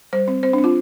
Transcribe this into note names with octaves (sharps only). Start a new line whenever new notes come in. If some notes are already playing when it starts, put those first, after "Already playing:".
G3 C5
C4
C4 C5
D4
C4
F4